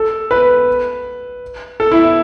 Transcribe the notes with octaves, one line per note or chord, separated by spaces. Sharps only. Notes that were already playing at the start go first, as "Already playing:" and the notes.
Already playing: A4
B4
A4
E4